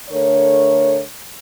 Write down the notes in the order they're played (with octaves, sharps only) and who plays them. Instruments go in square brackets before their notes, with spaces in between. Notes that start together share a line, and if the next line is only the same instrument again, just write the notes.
[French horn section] D3 A3 A#4 C#5